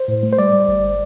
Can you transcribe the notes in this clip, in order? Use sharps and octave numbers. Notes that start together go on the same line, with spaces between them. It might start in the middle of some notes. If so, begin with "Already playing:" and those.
Already playing: C5
A2
A3
C5
G3 D5
G3
G1